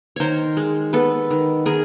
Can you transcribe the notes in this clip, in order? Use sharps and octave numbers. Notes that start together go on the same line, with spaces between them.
D#3 A#4 C5 C#5
G#3
B3 A4 B4
D#3
D#3 G#4 A#4